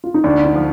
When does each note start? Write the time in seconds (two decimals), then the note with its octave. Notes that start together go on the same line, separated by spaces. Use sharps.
0.04 F4
0.14 D#4
0.24 D2 D4
0.45 D#4
0.55 F3